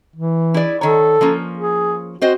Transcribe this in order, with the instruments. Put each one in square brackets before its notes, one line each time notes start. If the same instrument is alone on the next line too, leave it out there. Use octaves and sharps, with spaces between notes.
[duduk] E3
[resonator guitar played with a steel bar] E4 G#4 D5
[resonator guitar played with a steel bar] D#3 C#5 [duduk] A4
[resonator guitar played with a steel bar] F3 A#3 C#4
[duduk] G#4
[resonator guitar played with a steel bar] C4 C5 D#5 [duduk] F#4